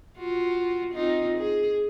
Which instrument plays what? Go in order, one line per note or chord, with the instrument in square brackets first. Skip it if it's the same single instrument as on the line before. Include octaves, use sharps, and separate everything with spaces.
[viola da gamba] F4 F#4
C4 D#4 F4
G#4